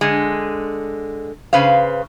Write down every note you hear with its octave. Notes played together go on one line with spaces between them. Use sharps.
D3 G#3
C#3 B4 C5 F5